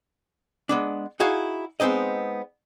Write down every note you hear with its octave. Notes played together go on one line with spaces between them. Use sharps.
G#3 B3 D4
D#4 E4 F#4 G#4 F5
G#3 B3 C4 D#4 D#5